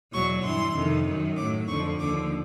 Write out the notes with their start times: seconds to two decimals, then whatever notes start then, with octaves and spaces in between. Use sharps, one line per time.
0.13 E2 B2 F#3 C#6
0.44 G2 E3 C6
0.75 F2 C3 D#3
1.07 F#2 D#3 F#3
1.37 A2 F#3 D6
1.68 F2 D3 F3 C#6
1.99 D#2 D3 F3 D6